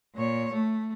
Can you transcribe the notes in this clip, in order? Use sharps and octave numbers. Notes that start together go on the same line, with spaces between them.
A#2 C#5
A3